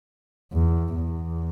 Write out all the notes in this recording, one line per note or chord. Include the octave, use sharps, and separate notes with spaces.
E2
E2